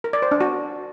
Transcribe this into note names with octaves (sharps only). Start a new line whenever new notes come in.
A#4
D5
C5
D4
F#4